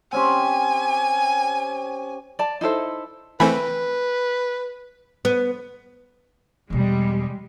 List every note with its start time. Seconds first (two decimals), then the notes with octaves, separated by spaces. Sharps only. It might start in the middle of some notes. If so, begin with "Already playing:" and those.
0.13 C4 C#4 G4 G#5
2.39 D5 A5
2.61 D#4 E4 A4 C5
3.40 E3 A3 C4 A#4 B4 G#5 B5
5.25 B3
6.70 E2 B2 G3 G#3